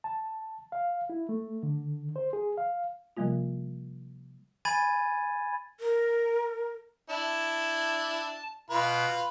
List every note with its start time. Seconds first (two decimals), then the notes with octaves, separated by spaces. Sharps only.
0.04 A5
0.72 F5
1.10 E4
1.29 A3
1.63 D3
2.16 C5
2.33 G#4
2.58 F5
3.17 C3 F3 G3 A#3 F4
4.65 G#5 B5 G#6 A6 D#7
5.80 A#4
7.10 D4 E4 A5
8.70 B2 F4 B4